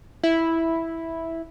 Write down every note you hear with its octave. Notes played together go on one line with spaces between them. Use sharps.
E4